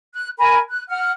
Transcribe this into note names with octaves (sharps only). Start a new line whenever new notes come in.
F#6
A#4 G#5 B5
F#6
F#5 F6